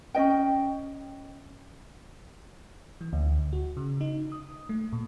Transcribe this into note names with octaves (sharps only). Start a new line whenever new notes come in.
C#4 D#4 D#5 G5
E3
D2
F#4
C#3
D#4
D#6
A3
A#2